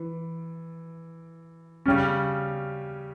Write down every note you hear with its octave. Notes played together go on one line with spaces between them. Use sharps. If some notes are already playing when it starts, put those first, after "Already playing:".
Already playing: E3
C#3 G3 C#4